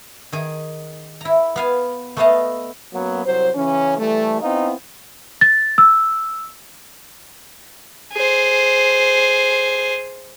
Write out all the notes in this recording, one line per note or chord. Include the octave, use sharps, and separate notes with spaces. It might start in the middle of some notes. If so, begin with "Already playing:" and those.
D#3 G#4
E4 A#5
B3 F5 G#5
A3 B3 A4 D#5 F5 A5
F#2 F#3 A#3 B3
C2 F#3 C5
C#3 E3 C#4
E3 G3 A3
B3 C4 D#4 E4 F5
A6
E6
G#4 C5